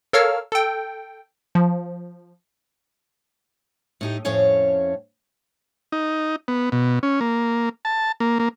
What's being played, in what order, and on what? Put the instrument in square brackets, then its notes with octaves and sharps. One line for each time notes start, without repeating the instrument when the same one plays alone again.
[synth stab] A4 A#4 C#5 F5 E6 F6
A4 G5
F3
[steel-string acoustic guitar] A2 D#4 G4
F2 A2 C#4 C#5 F5
[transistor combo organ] D#4
B3
B2
C#4
A#3
A5
A#3
A#3